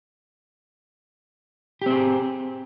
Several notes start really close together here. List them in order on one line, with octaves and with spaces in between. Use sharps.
G4 C4 G#4